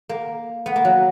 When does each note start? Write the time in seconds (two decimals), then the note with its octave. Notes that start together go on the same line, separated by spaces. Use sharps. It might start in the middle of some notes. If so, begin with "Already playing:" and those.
0.09 A#3
0.66 B3
0.76 A#3
0.85 F#3